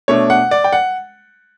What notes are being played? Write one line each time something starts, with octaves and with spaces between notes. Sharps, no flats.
B2 A3 D4 C#5
F#5
D5
G5
F#5